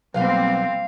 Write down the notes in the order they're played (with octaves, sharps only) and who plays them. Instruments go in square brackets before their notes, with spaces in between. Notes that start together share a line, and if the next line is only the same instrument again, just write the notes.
[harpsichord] B1 [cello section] G3 A#3 C4 [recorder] F5